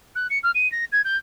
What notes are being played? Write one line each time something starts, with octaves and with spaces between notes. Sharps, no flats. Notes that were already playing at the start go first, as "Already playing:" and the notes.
F#6
C#7
F6
D#7
A#6
G#6
G6